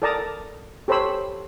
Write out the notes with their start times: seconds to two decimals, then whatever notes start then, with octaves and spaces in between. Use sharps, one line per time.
0.02 A4 A#4 D5 A5 A#5 D#6
0.88 G4 A4 C5 C#5 B5 E6